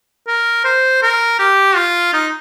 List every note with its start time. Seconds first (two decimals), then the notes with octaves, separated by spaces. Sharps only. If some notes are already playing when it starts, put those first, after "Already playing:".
0.28 A#4
0.65 C5
1.02 A#4
1.39 G4
1.76 F4
2.13 D#4